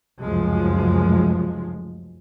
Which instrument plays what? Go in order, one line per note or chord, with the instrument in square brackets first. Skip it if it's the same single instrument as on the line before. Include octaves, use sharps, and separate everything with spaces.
[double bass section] F1 C#2 F#2 F3 G#3